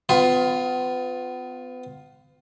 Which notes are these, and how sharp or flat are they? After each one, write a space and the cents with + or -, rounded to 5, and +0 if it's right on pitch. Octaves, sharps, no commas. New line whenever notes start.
B3 +35 F4 +10